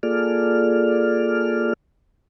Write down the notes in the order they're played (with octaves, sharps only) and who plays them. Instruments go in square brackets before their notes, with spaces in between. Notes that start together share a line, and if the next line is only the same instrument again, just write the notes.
[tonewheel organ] A#3 F4 G#4 A4 D5 F6